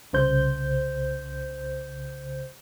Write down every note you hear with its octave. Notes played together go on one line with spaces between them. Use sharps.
C2 C#3 C5 G6